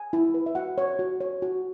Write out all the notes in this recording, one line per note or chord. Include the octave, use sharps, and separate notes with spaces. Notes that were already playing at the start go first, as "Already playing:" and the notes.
Already playing: G#5
E4
B4
E5
F#4 F#5
C#5
F#4
C#5
F#4